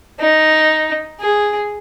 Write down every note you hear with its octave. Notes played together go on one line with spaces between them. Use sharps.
D#4
G#4